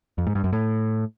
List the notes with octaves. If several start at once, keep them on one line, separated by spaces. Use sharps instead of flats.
F2
G#2
G2
F#2
A2